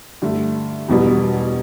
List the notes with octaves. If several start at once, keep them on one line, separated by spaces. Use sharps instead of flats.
G2 D3 A3
E1 E2 B2 G3 B3